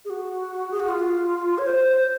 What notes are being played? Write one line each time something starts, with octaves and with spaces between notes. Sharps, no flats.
G#4
F#4
G#4
F#4
F4
C#5
C5